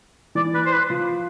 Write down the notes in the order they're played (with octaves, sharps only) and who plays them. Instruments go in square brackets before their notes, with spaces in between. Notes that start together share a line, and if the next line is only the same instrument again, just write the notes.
[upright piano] E3 [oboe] D5
[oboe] B4
C5
B4
[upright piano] F3